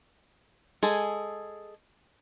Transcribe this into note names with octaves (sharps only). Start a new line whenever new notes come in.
G#3 G#4 A4